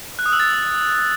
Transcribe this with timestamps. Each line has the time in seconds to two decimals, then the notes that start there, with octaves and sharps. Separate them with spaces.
0.19 F#6
0.26 D#6
0.33 E6
0.40 A6